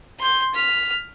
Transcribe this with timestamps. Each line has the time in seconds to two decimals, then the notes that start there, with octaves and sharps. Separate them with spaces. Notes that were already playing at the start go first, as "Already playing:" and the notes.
0.19 C6 G6
0.54 F6 B6